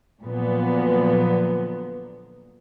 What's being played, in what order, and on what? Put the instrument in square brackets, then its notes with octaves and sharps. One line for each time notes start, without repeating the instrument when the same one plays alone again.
[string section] A#2 D3 F3 F#3 B3